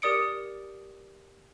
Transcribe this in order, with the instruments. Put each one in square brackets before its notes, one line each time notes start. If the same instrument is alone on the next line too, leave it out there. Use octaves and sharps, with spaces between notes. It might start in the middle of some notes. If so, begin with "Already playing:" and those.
[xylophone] G4 A#4 D5 D#6 C#7 D7